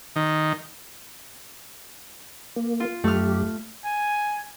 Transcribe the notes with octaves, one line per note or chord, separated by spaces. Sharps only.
D#3
A#3
F4
F#2 A3 G4 F6
G#5